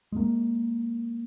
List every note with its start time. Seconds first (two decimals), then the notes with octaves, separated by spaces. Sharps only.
0.12 G#3 A#3